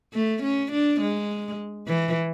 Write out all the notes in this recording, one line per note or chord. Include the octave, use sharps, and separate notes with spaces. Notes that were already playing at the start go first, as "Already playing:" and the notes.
A3
C#4
D4
G#3
E3